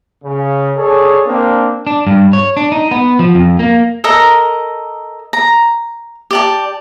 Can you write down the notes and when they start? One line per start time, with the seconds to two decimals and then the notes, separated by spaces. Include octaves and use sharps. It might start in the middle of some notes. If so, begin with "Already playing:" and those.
0.24 C#3
0.77 G#4 A4 C#5 D5
1.27 A#3 C4 D4
1.87 D4
2.07 G2
2.33 C#5
2.57 D4
2.72 D#4
2.91 B3
3.19 F3
3.35 F2
3.59 A#3
4.04 A4 A#4 D#5 A#5
5.33 A#5
6.31 G4 D5 A5